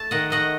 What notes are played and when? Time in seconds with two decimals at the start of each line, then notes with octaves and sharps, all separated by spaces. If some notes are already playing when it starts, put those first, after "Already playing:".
Already playing: A3 A5
0.11 D#3 D#5 F#5
0.30 A3 D#5 F#5